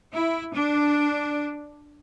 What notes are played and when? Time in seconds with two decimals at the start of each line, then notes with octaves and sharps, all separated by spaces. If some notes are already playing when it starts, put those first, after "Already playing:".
0.12 E4
0.53 D4